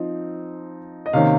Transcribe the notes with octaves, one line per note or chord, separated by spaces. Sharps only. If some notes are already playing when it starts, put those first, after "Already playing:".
Already playing: F3 C4 D#4
D#5
C3 D#3 A#3 C#4 F5